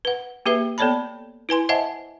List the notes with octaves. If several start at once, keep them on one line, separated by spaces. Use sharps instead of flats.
B4 F#5
A#3 G4 G#4 B4 E5
B3 A4 C#5 D5 A5 B5
E4 B4 G#5 C6
C5 D#5 E5 F#5 G#5 A5